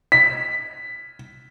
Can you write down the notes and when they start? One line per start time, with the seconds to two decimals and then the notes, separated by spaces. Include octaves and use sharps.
0.12 B6